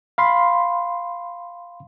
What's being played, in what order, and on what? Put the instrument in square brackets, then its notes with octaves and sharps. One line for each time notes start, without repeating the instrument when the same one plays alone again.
[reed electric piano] F5 B5 C6